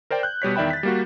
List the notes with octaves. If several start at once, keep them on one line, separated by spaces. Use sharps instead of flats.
A#4 C5 D5 G5
F#6 G6
B2 G3 C#5 B6
E2 D#3 D5 E5 G5 B5
A6 B6
G3 A#3 F#4